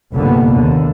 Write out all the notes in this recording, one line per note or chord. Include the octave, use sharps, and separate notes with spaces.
F1 A#1 G2 A#2 D3 B3
D#2 D3